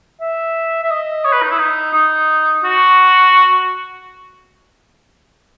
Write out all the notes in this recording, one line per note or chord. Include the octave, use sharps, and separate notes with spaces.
E5
E5
D#5
C#5
B4
D#4
E4
D#4
D#4
F#4